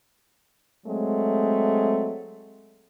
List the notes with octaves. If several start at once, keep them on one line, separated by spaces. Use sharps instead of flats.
F#3 G#3 A3 C4